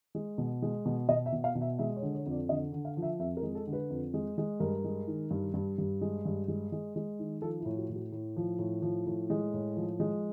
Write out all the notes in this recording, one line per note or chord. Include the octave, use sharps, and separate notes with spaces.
G#3
B2
G#3
B2
B2 D#5
E5
B2
F5
B2
E5
G#3 E5
C#5
D3
C#5
F2
D5
D3 D#5
D3
F5
F3
E5
F2 E5
A#4
G#3
A4
D3
B4
F2
G#3
G#3
G2 A#4
G#3
D#3
G2
G2
G2
G#3
G2
G#3
G#3
G#3
D#3
F3 A4
E4
A2
F#4
A2
F#4
A2
F3
A2
F3
A2
G#3
A2
F3
G#3